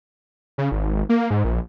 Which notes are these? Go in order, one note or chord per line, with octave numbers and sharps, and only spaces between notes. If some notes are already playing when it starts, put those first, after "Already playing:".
C#3
G#1
A#3
G#2
A#1